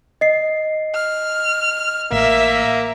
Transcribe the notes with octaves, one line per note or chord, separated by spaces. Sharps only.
D#5 C7
F6
A1 A#3 E5